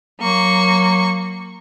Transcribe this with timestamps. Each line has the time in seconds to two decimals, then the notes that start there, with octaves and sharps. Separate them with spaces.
0.21 F#3 A#3 C#6